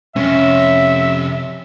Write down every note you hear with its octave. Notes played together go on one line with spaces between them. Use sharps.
F2 C3 C#4 E5